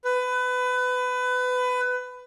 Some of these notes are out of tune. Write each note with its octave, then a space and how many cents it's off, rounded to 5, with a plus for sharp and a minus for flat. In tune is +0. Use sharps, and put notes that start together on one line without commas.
B4 +25